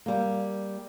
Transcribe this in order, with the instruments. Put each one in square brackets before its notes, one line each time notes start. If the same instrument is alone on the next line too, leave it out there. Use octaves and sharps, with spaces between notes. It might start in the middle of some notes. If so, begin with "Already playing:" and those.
[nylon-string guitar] G3 A#3